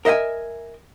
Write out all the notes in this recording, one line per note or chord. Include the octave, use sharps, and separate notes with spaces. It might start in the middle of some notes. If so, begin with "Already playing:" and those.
A#4 D#5 E5 F#5 G#5